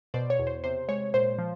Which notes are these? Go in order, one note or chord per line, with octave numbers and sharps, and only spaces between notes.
B2 C5 D5
C#5
E2
C5
C3 C5
G#3 C#5
A#2 C5
F3